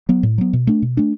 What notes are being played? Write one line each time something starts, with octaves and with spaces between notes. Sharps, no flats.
F#3 B3
A2
F#3 B3
B2
A3 D4
B2
A3 D4